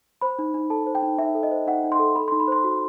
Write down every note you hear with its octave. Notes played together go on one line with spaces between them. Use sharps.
C5 B5
D#4
D#4
A4 A5
C5
G5
D#4
D#4 E5
A4
D#5
C5
D#4 F#5
D#4
C6
A4
A4 B5
C6
D#4
B5
C5 C6
F#4